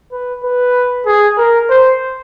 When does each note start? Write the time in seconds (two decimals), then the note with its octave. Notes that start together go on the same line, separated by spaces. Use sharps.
0.12 B4
0.44 B4
1.07 G#4
1.38 A#4
1.70 C5